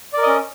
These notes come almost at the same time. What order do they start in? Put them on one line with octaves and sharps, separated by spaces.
D5 A#4 D#5 C#4